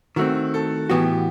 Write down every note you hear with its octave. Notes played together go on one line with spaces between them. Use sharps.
D#3 A3 C4 F#4
A4
A2 E3 B3 F#4 G4